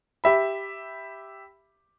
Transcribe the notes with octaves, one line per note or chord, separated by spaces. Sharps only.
G4 E5 B5